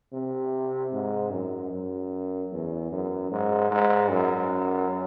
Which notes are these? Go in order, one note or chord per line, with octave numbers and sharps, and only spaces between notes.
C3
G#2
F#2
F#2
E2
F#2
G#2
G#2
F#2